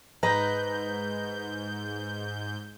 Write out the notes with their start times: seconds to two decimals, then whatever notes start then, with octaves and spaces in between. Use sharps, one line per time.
0.23 G#2 B4 D#5 A#5 G6